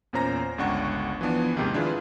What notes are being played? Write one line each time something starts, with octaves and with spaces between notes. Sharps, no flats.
E2 A#2 C#4 C5 A#5 A#6
G1 C#2 D4 F#5 C#6
E3 F3 B3 D4
D#2 G#2 C3 D#3 A#3
D4 E4 F4 G#4 B4 F5